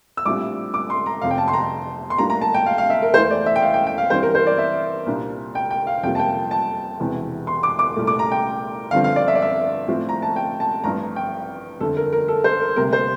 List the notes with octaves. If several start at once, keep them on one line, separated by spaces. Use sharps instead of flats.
E6
A#1 A2 G3 C4 F4 D6
D6
C6
A#5
F1 F2 C3 F5
G5
A5
C6
A#5
C6
A2 G3 A#3 D4 F4 A#5
A#5
A5
G5
F5
F5
E5
A#4
E2 E3 A3 C5
D5
E5
G5
F5
G5
G5
F5
G2 E3 G3 C4 C5
A#4
C5
D5
E5
C2 A#2 G3 D4 F4
G5
G5
F5
F2 C3 G3 A#3 F4 G5
A5
G5
A5
E1 E2 C3 E3
C6
D6
D6
C2 A#2 A3
D6
A#5
G5
G1 G2 D3 F3 C4 F5
F5
D5
E5
D5
E5
A2 F3 C4 F4
A#5
A5
G5
A5
A1 G2 F3 C4 A#5
G5
G1 F2 D3 A4
A#4
A#4
A4
C5
A#4
D2 C3 G3 A#3 A#4
C5